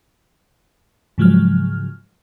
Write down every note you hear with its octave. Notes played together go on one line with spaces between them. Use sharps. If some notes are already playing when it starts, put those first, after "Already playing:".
G#2 C#3 F3 F#3 G#3 F6